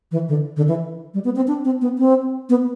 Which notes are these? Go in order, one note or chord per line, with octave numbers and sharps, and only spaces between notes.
E3
D3
D3
E3
G3
B3
C4
D4
C4
B3
C4
B3